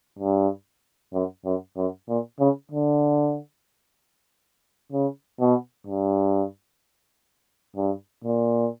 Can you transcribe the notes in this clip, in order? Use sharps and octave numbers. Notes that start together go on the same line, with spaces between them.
G2
F#2
F#2
F#2
A#2
C#3
D3
C#3
B2
G2
G2
A#2